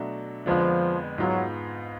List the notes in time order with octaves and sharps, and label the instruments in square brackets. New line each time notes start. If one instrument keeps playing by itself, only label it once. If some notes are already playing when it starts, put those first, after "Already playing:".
Already playing: [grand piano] B2 F#3 A3 D4 F#4
[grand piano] F2 D3 G#3 B3 D4 [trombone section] F3
[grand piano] G#2 G#3 B3 F4 [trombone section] F#3